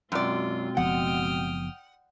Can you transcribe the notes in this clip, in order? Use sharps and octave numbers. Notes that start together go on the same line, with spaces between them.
F#2 B2 G#3 C4 F4 D5
F#1 F3 B3 F#5 G5 D#6 F6